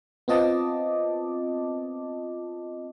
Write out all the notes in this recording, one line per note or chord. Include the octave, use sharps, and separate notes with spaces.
B3 C4 F4 D#5 A5 D6